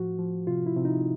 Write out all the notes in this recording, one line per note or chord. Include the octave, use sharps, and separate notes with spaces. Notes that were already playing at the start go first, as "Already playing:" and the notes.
Already playing: A2 F3 F#4
F3
C3 F4
E4
C3
D#4